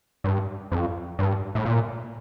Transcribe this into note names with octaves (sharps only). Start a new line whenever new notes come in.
G2
F2
G2
A2
A#2